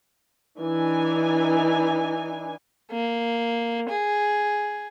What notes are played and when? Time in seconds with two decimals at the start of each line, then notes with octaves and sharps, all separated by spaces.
0.59 E3 D4 D#4 G#5
2.92 A#3
3.89 G#4